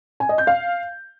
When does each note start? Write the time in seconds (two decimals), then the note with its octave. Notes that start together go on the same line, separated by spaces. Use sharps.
0.20 G#5
0.29 D#5
0.38 G6
0.47 F5